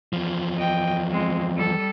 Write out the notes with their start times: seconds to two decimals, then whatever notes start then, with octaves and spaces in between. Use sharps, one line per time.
0.13 E2 F3
0.57 D#5 G5
1.10 G#3 C4
1.55 G3 A4